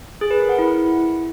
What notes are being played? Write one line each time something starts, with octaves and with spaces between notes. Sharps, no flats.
G#4
B4
A#4
F#5
E4